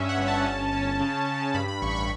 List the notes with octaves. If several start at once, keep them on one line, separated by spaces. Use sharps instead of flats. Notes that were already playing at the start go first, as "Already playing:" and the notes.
Already playing: G2 C#4 E5
F#5
G1
A5
C#4
C#4
C#3
C#3
G2 B5
B5
A1 C#6
B5